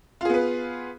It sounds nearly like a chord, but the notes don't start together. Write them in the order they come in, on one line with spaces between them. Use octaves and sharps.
F4 G#4 B3 B4